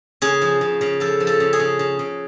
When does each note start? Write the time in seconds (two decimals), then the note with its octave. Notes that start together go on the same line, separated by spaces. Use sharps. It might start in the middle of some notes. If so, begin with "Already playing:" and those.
0.22 C#3 G#4
0.42 F3
0.61 C#3
0.81 C#3
1.00 F3 A4
1.20 F3
1.27 A4
1.40 C#3
1.53 G#4
1.60 C#3
1.79 C#3
1.99 C#3